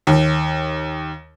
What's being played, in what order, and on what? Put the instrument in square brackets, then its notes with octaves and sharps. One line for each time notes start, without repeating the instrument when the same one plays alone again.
[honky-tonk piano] D#2